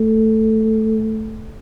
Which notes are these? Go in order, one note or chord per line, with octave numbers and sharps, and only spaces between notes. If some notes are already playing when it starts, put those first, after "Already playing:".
Already playing: A3